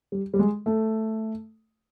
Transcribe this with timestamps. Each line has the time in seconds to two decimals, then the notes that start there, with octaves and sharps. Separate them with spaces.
0.12 G3
0.34 G3
0.39 G#3
0.66 A3